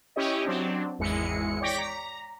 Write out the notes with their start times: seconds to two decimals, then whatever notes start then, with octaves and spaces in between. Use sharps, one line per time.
0.16 C#4 E4 G4 C#5 D#5
0.45 F#3 C4 D4
0.99 G#1 E2 G#3 E4 C#7
1.61 C#5 D5 G5 D6 A#6 B6
1.78 A#5